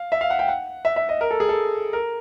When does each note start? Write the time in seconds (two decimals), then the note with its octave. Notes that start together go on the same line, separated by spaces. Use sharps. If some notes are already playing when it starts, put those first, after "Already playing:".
Already playing: F5
0.12 E5
0.21 F5
0.30 F#5
0.39 G5
0.48 F#5
0.85 E5
0.96 E5
1.09 D#5
1.21 A#4
1.31 A4
1.40 G#4
1.49 A4
1.93 A#4